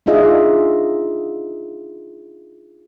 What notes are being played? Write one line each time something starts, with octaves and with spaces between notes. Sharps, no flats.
D4 D#4 F4 G#4 D#5 E5